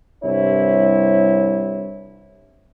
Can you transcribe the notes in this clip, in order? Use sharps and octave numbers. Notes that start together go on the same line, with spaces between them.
C2 G2 E4 C#5